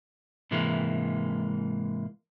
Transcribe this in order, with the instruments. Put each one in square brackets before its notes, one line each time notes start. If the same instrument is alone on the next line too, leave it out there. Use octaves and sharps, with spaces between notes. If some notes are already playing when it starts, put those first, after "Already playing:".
[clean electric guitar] G#2 C3 E3 G#3 A#3